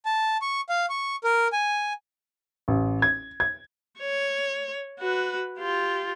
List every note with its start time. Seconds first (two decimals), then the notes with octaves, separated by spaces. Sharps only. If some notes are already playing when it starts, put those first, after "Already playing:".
0.05 A5
0.42 C#6
0.69 F5
0.90 C#6
1.24 A#4
1.53 G#5
2.68 A1
3.02 G#6
3.40 G#6
3.99 C#5
4.99 F#4 B4
5.58 F4 G4